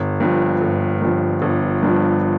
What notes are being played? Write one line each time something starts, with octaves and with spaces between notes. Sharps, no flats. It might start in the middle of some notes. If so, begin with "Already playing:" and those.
Already playing: G1
G2 F3
G1
G2 F3
G1
G2 F3